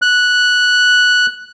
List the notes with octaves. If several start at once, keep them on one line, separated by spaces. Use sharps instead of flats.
F#6